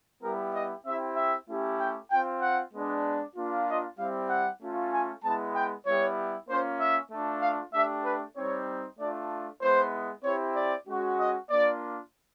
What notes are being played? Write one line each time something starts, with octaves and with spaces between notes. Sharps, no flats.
G3 B3 E4 G4 A#4
D#5
C4 E4 G4 E5
E5
A3 C#4 E4 G4
G5
C4 F4 G5
F#5
G#3 B3 D4
A#3 D4 F4
D#5
G3 C4 E4 G4 F5
F#5
A3 C#4 F4
G#5
G#3 B3 E4 A5
G5
G3 B3 E4 G4 C#5
A#3 C#4 F4 C5
E5
A3 D4 F4
F5
A3 D4 G4 E5
B4
G3 C4 D#4 C#5
A3 D4 F4 D5
G#3 B3 E4 C5
C4 E4 G4 C#5
D5
G#3 C#4 F#4
D#5
A#3 D4 F4 D5